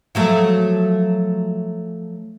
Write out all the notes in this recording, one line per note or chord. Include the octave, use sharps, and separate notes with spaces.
F3 F#3 A3